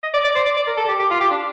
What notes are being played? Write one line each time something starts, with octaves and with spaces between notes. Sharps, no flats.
D#5
D5
D5
C5
D5
D5
A#4
A4
G4
G4
F4
G4
D4